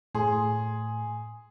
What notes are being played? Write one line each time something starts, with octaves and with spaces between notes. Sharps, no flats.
A2 G#4 C6